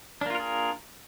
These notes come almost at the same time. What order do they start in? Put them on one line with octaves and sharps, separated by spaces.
D4 A#3 F4 A#4 G#4